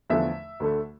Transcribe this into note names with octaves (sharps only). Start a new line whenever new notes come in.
E2 D3 F3 A3 E5
D2 D3 A3